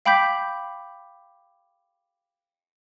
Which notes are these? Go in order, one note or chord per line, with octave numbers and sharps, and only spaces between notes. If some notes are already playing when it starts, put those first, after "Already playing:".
F5 G5 B5 D6 G6 B6